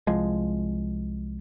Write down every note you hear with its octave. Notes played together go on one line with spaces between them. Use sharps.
C2 F3 G#3